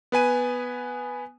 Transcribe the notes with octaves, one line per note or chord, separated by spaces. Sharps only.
B3 B4 G#5 D#7